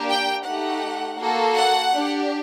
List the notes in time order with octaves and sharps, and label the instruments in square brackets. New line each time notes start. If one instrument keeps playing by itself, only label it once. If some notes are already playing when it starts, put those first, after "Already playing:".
Already playing: [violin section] A#3 D4 G4
G5
A3 D#4 G4 F#5
A#3 F#4 A4
F#5
D4 G4